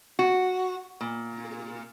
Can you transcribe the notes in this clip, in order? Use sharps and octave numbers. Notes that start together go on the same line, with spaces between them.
F#4
A#2